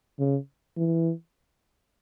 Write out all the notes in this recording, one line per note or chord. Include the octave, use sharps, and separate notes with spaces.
C#3
E3